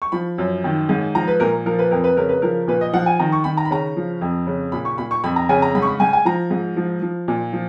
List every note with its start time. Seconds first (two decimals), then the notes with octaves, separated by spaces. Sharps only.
0.02 C#6
0.12 F3 B5
0.38 F#2
0.64 D#3
0.89 G#2
1.15 F3 A#5
1.27 B4
1.40 A#2 A#4
1.66 F3 A#4
1.79 B4
1.91 F2 A#4
2.04 B4
2.17 C#3 A#4
2.29 B4
2.42 F3 A#4
2.68 A#2 B4
2.81 D#5
2.93 F3 F#5
3.06 G#5
3.19 D#3 A#5
3.32 C#6
3.44 D#3 B5
3.57 A#5
3.65 B5
3.71 C#3 A#5
3.96 F3
4.21 F2
4.47 C#3
4.72 A#2 B5
4.85 C#6
4.98 A#2 B5
5.11 C#6
5.24 F2 B5
5.36 A#5
5.49 C#3 G#5
5.62 A#5
5.75 G#2 B5
5.82 C#6
5.87 B5
6.00 G#2 G#5
6.13 G#5
6.25 F3 A#5
6.51 G#2
6.76 F3
7.02 F3
7.28 A#2
7.53 F3